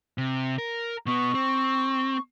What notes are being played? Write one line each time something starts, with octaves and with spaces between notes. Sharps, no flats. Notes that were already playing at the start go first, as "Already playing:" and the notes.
C3
A#4
B2 B3 C#6
C4